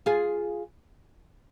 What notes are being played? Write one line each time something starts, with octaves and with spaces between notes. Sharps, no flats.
F4 G#4